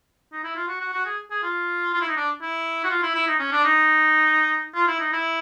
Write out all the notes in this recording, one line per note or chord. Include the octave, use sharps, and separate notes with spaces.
D#4
E4
F4
F#4
F#4
F#4
G#4
G#4
F4
F4
E4
D#4
D4
E4
F#4
F4
E4
E4
D#4
C#4
D4
D#4
F4
E4
D#4
E4